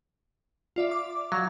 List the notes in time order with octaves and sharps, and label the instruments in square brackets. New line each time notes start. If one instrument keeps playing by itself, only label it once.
[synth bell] F4 D5 E5
D6
[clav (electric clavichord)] F#3 [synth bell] F5